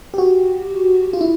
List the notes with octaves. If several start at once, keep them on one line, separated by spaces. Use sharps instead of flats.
G4
F#4
F4
E4